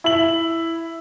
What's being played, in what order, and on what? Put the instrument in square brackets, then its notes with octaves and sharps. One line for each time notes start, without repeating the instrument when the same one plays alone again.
[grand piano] E4 F#7